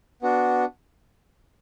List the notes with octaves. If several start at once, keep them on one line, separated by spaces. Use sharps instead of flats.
B3 D4 F#4